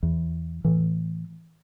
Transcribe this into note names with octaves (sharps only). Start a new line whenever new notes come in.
E2
A2 E3